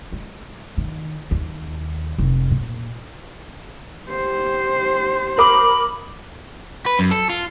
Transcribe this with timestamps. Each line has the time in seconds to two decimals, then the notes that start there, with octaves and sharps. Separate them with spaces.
0.12 G#3
0.78 D#3
1.31 D#2
2.18 F1
2.51 A#2
4.09 G4 C5
5.38 A#4 B5 D6 D#6
6.86 B4
6.99 F#2
7.11 A4
7.29 F4